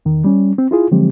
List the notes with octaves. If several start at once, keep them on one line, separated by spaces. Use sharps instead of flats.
E2 D#3
G3 C#4
C4
E4 F4 G#4
D3 F3 F#3 G#3 C4 G4